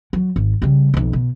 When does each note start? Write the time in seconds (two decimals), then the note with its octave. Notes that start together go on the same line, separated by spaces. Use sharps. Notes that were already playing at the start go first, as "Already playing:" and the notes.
0.13 F#3
0.36 G#1
0.62 C#3 G3
0.94 B1 F2
1.13 B2